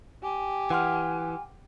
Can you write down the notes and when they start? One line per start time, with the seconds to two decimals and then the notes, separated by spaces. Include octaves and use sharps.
0.23 G4 G#5
0.70 E3 F#5 C6 F6